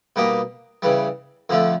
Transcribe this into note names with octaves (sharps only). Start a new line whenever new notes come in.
B2 G3 A#3 D#4 G4
C#3 E3 G3
F2 D3 F3 A3